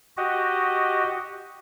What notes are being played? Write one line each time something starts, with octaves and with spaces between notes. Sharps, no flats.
F#4 G4 D#5